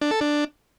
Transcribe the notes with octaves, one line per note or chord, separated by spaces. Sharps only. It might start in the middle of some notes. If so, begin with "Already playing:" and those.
D4
A4
D4